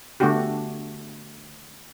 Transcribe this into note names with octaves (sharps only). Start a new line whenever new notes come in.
D3 A3 B3 D4 F#4 G4